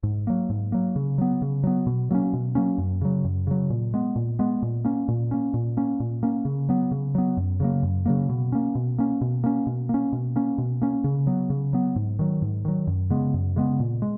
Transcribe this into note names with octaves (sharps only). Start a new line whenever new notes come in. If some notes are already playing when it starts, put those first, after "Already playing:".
G#2
F#3 A#3
G#2
F#3 A#3
C#3
F#3 B3
C#3
F#3 B3
B2
F#3 A#3 C#4
B2
F#3 A#3 C#4
F#2
C#3 F#3
F#2
C#3 F#3
A#2
G#3 B3
A#2
G#3 B3
A#2
A#3 C#4
A#2
A#3 C#4
A#2
A#3 C#4
A#2
A#3 C#4
C#3
F#3 B3
C#3
F#3 B3
F#2
C#3 F#3 A#3
F#2
C#3 F#3 A#3
B2
A#3 C#4
B2
A#3 C#4
B2
A#3 C#4
B2
A#3 C#4
B2
A#3 C#4
B2
A#3 C#4
C#3
F#3 B3
C#3
F#3 B3
G#2
D#3 F#3
G#2
D#3 F#3
F#2
C#3 G#3 B3
F#2
C#3 G#3 B3
A#2
G#3